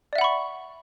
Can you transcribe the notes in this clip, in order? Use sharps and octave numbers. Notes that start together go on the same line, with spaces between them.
D5 E5 F#5 B5 C#6